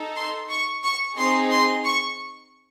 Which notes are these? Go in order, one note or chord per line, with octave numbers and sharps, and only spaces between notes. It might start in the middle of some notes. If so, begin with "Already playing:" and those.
Already playing: D#4 A4
C6
C#6
C#6
C4 D#4 G#4 C6
C6
C#6